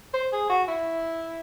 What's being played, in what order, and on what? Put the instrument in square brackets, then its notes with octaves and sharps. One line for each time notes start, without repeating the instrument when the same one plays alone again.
[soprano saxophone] C5
G#4
F#4
E4